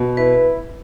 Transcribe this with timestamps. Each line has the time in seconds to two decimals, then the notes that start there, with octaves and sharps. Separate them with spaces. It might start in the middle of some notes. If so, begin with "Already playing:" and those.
Already playing: B2
0.17 E4 B4